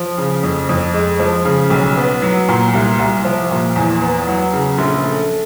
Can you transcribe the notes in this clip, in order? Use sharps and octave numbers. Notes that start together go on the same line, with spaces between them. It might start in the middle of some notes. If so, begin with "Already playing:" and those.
Already playing: F3
C#3
F2
F2
G#3
F3
C#3
B1
B3
F#3
A#2
C2
C2
F3
A#2
E2
B3
F#3
C#3
A#1
A3